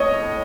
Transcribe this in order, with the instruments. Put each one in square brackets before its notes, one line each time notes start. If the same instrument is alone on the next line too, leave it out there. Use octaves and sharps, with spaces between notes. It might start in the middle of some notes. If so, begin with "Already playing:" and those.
Already playing: [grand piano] A2 C#5 D#5